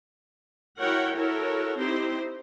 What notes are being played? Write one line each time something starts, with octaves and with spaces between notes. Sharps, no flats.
E4 F#4 A#4 C#5 F#5 G5
E4 F#4 A4 A#4 C#5
C4 D#4 E4 G4 C5